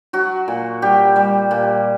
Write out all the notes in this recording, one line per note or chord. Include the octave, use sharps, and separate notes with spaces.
F#3 F#4
A#2
G3 G4
G3
A#2